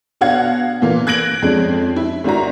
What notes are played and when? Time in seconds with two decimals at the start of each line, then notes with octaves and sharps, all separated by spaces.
0.21 B2 D4 F5 F#5 G#6
0.82 A#2 E3 A#3
1.07 F#6 G#6 A#6 D7 F#7
1.42 F2 G#3 C#4 D4
1.96 E4
2.24 G#1 D4 E4 F#4 A#5